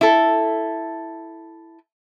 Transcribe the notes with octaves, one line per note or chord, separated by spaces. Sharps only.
E4 A4